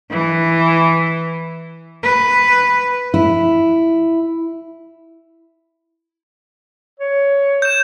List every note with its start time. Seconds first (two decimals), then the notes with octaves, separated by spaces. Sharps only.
0.11 E3
2.03 B4
3.14 E4
7.00 C#5
7.62 G6 E7